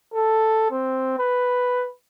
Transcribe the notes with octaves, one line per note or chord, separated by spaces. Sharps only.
A4
C4
B4